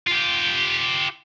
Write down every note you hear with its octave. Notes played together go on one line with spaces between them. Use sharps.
F4 G4